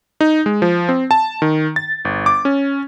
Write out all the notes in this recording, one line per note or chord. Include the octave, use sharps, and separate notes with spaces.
D#4
G#3
F3
C4
A5
D#3
A6
G1
D6
C#4